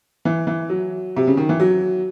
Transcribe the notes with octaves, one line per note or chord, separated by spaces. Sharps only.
E3
E3
F#3
C3
C#3
D#3
E3
F#3